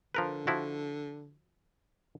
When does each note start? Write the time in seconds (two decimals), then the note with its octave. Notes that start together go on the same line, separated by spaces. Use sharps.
0.15 D3 F3 A#4 B4
0.47 F3 E4 F#4